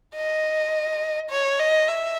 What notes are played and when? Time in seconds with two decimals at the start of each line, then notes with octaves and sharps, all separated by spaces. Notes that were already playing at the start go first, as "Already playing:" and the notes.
0.16 D#5
1.30 C#5
1.59 D#5
1.89 E5